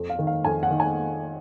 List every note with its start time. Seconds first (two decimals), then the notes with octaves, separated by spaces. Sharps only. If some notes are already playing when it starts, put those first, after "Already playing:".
Already playing: F2
0.10 F5
0.19 D#3
0.27 F5
0.45 F2 G#5
0.63 F#5
0.70 D#3
0.80 G#5